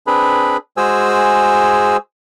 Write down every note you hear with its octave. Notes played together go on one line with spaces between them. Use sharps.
C4 D4 G#4 B4 B5
G#3 F#4 G#4 C5 G#5 E6